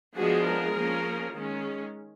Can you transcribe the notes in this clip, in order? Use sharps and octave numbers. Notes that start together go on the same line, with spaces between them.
F3 G#3 B3 D4 F#4 G#4
G#4 A#4
F3 A#3 C#4
D#3 G#3 C#4